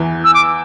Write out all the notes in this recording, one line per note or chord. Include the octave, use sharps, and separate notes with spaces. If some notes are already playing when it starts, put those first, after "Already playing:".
Already playing: E2 E3
E6
D6